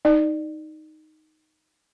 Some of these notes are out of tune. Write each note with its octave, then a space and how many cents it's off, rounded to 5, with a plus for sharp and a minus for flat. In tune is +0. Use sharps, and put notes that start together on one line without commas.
D#4 +0 D5 +25